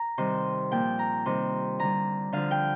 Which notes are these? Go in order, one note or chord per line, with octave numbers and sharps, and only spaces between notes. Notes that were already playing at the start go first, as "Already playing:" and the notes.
Already playing: A#5
C3 D#3 G3 C6
A#2 F3 G5
A#5
C3 D#3 G3 C6
D3 G3 A#5
D3 F3 F5
G5